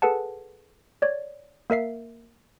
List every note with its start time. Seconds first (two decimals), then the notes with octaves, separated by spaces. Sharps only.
0.02 G#4 A4 B4 F#5 A5
1.02 C#5 D5
1.70 A#3 A#4 E5 C7